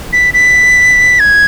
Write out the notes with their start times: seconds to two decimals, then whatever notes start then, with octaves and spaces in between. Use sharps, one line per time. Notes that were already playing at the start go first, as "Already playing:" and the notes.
0.13 B6
0.34 B6
1.20 G#6